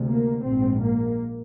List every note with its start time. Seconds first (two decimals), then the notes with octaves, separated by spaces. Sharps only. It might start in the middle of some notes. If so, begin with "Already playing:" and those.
Already playing: D2 C3
0.09 A#3
0.44 A#1 G#2 C4
0.80 A#3